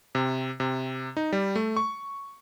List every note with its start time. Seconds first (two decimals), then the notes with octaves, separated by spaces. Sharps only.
0.15 C3
0.60 C3
1.17 D#4
1.32 G3
1.56 A3
1.77 C#6